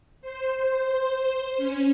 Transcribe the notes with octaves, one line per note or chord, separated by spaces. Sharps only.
C5
C#4